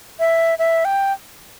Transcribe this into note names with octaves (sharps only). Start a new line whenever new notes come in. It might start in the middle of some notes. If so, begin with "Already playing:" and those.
E5
E5
G5